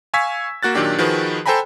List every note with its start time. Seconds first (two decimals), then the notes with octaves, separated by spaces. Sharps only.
0.14 F5 G#5 C#6 E6 G#6 B6
0.63 A#3 F#4 F#6 A6
0.75 A#2 D#3 F#3 D4 G4
0.98 D#3 F3 F#4 G#4 B4
1.46 A4 C5 G5 G#5 A#5 B5